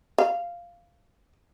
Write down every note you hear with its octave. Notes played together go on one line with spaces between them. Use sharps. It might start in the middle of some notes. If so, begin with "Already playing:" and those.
F5